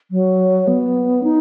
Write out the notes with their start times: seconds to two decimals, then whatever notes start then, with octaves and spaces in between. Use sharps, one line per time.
0.11 F#3
0.68 B3
1.24 D#4